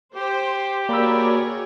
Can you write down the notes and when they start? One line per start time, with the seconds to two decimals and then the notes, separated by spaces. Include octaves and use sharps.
0.16 G4 C5
0.89 A#3 F#4 G#4 A#4 C#5 D5 B5 E6